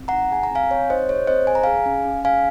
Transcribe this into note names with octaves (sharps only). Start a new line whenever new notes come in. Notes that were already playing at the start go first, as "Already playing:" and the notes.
Already playing: C4
D#4 F#5 A#5
G#4 G#5
A#5
C4 F5 G#5
C4 C#5
D#4 C5 D#5
G#4 C#5
C4 C5 D#5
G#4 G#5
A#5
G#4 F5 G#5
C#4
C#4
G#4 F5 G#5